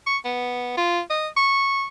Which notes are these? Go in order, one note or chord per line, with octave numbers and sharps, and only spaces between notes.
C#6
B3
F4
D#5
C#6